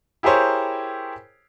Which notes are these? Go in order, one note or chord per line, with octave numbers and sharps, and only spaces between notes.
E4 G4 G#4 A#4 C5 C#5